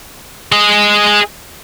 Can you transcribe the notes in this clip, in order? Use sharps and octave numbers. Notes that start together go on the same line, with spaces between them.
G#4 D#5